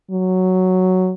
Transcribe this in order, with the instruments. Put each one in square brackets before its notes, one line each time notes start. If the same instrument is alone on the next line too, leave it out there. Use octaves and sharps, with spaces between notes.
[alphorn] F#3